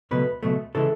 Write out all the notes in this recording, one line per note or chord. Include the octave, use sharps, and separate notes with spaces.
C#2 B2 F#3 A3 B4
C#2 B2 F#3 A3
C#3 E3 G#3 A4